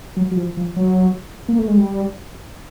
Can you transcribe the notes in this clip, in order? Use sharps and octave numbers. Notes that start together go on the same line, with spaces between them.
F#3
F#3
F3
F3
F#3
A#3
A3
G#3
G3